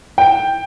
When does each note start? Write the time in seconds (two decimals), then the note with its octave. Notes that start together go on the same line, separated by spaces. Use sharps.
0.18 G5